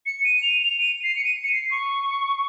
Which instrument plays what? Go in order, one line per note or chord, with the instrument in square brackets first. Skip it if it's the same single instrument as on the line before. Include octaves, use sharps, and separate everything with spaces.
[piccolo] C#7
D#7
F7
F7
D#7
C7
C#7
D#7
C#7
C7
C#6